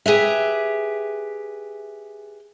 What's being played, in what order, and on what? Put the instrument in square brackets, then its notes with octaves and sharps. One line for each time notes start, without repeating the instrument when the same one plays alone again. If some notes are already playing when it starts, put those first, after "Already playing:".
[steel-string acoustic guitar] G4 G#4 B4 E5